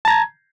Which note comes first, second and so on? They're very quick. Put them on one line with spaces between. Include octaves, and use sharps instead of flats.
A5 A#5 G#6